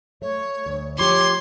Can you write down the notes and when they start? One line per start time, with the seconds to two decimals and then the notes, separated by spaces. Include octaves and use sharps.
0.22 A3 C#5
0.66 D2
0.98 F3 G4 C#5 C6 D6